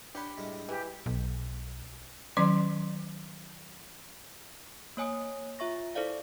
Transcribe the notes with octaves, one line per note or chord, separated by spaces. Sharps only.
D4 G4 C#5 F#5 B5 C6
A2 G3 G#3
E3 G4
B1
D#3 F#3 C#4 D5 C6
A#3 C#5 G#5 D#6 D7
F4 E5 C#6 A#6
E4 A4 C5 D5 F5